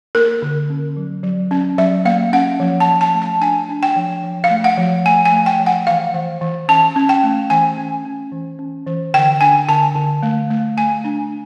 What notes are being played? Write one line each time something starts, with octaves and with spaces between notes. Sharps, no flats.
A#3 A#4
D3
C#4
F#3
F#3
C#4
F#3 E5
A#3 F5
C#4 F#5
F3
A5
F3
A5
A3
A5
D4 G#5
D4
G5
F3
F3
F5
A3
F#5
F3
A3 G#5
G#5
A3
G5
F3
F#5
E3 F5
E3
E3
C#4 A5
C#4
G5
A3
E3 G#5
C#4
C#4
E3
C#4
E3
D3 G5
D4 G#5
D3 A5
D3
A3
A3
A3 G#5
D4